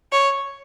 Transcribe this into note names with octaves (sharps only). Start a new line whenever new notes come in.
C#5